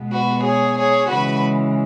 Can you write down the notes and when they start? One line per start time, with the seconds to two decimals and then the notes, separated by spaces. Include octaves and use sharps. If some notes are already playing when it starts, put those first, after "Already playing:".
Already playing: B2 G#3 B3
0.11 F#4 B4
0.43 G#4 C#5
0.77 G#4 C#5
1.09 C#3 E3 G#3 F#4 B4